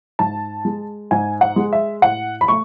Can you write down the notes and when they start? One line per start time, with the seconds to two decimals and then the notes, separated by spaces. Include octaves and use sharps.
0.19 G#2 A5
0.65 G#3
1.11 G#2 G#5
1.41 F#5
1.56 G#3
1.73 E5
2.02 A2 F#5
2.41 B5
2.48 A3 C#6